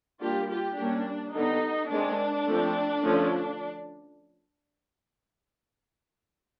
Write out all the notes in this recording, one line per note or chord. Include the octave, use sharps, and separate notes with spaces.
G3 A#3 D4 F4 G4
F4 G4
G3 A#3 C#4 D4
D3 G3 B3 D4 D#4
D#3 G#3 C4 D4
F3 A3 C4
D3 F3 A3 C#4